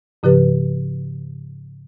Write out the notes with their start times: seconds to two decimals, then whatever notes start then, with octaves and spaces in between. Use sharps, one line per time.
0.23 G#2 C#3 F3 G4 B4